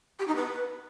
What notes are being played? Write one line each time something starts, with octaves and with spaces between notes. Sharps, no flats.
G4
D#4
B4